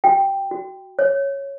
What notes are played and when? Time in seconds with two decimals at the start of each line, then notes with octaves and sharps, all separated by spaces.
0.04 F#4 G5
0.51 F#4
0.99 C#5